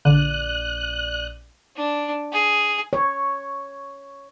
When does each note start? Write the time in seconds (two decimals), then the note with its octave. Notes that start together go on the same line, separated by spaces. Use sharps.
0.05 A#1 D3 D5 F#6 D#7
1.77 D4
2.33 G#4
2.93 C#5